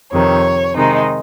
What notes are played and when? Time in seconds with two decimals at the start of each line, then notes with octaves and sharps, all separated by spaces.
0.12 F2 C3 D#3 C#5
0.75 C3 D#3 G#3 D#4